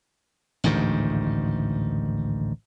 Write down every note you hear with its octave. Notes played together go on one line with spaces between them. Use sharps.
A1 D2 G#2 D#3